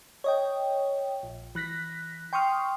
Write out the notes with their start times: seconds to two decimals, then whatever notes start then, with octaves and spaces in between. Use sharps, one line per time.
0.24 C#5 D#5 G5
1.23 A#1
1.55 E3 F#6 A#6 B6
2.33 G5 C6 C#6 D#6 F6